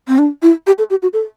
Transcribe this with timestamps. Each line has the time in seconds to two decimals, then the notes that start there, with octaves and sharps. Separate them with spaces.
0.08 C4
0.18 D4
0.42 E4
0.67 G4
0.78 A4
0.90 G4
1.02 F#4
1.13 A4